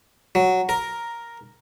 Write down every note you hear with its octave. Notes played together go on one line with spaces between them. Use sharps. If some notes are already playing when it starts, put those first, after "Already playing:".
F#3
A#4